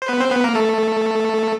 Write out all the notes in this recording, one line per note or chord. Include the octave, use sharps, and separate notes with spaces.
C5
B3 B4
C4 C5
B3 B4
A#3 A#4
A3 A4